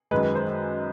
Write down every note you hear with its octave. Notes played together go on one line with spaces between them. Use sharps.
F#2 D#3 G#3 B4
B4
C5